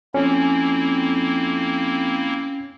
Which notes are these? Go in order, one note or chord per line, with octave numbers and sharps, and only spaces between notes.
F2 A#3 C4 C#4 E4